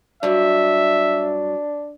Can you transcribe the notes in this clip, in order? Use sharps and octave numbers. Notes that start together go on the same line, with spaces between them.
G2 F#3 D4 E5